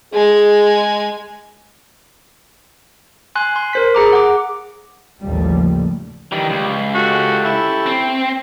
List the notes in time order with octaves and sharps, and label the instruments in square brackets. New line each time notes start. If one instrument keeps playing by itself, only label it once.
[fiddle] G#3 G#5 [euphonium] G#4
[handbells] G#5 C6 F#6
C6
A#4 C5 B6
G#4 A#5 D6
F#5 D6
[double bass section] A1 D#2 C#3 F3 G3 A3
[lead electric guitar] D#3 E3 [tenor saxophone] G3
[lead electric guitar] C#2
[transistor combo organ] C#4 G4 A4 [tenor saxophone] F#4
[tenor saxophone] E4
[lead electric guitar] C4